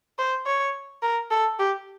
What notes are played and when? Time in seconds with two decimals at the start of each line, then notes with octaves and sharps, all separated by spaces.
0.18 C5
0.46 C#5
1.03 A#4
1.31 A4
1.59 G4